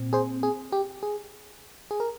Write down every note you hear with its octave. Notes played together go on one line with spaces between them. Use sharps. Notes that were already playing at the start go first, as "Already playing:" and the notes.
Already playing: A#2 C4
G#4 C5
G#4
G4
G#4
G#4
A#4